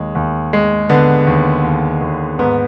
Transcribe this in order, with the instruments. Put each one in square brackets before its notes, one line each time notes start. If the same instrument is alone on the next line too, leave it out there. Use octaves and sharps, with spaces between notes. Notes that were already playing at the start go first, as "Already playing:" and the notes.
Already playing: [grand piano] D#2 G#3
D#2
G#3
D3 B3
D#2
D#2
D#2
G#2 B3